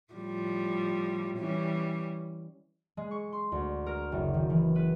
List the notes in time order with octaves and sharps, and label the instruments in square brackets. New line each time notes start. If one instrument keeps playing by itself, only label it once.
[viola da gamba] A2 F3 G3
E3 G3 C#4
[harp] G#3
C#6
C6
D2
A#4
F#1
D#3
E3
B4